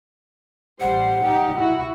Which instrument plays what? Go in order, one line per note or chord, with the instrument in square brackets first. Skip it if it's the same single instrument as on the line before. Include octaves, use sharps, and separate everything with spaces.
[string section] A1 G3 C5 [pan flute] F#5
[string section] G3 D#4 G4
E4 F#4